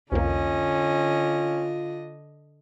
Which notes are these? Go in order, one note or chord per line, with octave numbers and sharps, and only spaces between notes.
C2 F2 D3 A#3 C#4 F4 D#5